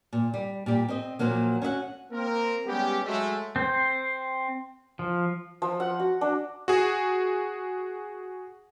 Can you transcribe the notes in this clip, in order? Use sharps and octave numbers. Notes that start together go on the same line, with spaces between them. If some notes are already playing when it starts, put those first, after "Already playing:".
A#2
G3
A#2 G3 G4
C4 D#5
A#2 F3 F#3 A#3
C#4 F#4 E5 F#5
A#3 C4 A#4
G3 G#3 B3 C#4 G4
F#3 G#3 A3
C4 C5
F3
F3
F#5
F#4
D4
F#4 G#4